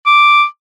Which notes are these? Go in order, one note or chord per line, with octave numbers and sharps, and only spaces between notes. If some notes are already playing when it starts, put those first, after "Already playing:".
D6